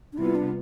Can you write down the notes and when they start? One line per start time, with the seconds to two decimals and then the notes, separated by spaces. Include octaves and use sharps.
0.13 D4
0.18 C3 G3 B3 E4 F4
0.35 D4